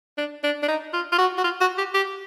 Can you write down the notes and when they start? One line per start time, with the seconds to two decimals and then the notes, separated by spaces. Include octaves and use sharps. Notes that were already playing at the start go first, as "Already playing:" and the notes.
0.18 D4
0.43 D4
0.63 D4
0.68 D#4
0.93 F4
1.12 F4
1.19 F#4
1.38 F#4
1.44 F4
1.61 F#4
1.78 G4
1.94 G4